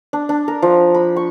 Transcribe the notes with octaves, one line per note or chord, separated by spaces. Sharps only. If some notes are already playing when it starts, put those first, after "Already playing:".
D4
D4
A#4
F3
B5
C#6